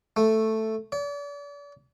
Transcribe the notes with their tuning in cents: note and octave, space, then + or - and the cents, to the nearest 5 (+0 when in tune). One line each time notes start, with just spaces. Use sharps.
A3 +0
D5 -40